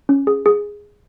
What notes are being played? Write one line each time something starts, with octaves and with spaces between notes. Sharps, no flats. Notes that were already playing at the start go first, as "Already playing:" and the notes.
C#4
G#4
G#4